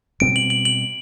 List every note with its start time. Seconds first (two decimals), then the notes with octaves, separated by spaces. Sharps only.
0.20 B2 G3 C4 D7
0.36 F#7
0.50 F#7
0.65 F#7